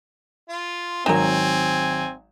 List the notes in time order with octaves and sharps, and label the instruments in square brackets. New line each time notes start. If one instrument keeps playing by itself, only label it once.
[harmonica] F4
[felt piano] G#1 F#3 E7 [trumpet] C4 [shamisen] D#4 A#4 [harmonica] G#5